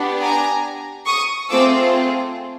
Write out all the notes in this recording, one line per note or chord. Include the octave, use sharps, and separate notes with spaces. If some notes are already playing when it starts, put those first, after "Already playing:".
Already playing: B3 D4 G4
G#5 A#5
C#6 D#6
A3 C4 F4 G#4 D6 E6